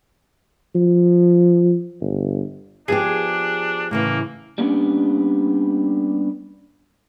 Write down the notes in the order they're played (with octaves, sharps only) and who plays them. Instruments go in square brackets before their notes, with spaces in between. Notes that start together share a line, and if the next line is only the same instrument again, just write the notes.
[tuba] F3
G1
[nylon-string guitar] F3 B3 G4 [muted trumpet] D4 [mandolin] G#4
[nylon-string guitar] A2 C#3 E3 [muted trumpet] A#3
[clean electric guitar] G3 A#3 B3 C#4 D4